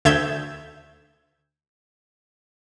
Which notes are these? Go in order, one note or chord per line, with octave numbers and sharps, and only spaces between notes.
D2 E5 G6 G#6 E7